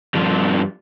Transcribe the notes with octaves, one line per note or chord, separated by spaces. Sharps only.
G2 F3